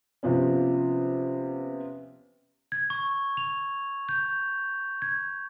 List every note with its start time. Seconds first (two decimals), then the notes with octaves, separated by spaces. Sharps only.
0.23 C3 F3 B3 C#4
2.72 G#6
2.90 C#6
3.37 F7
4.09 G6
5.02 G#6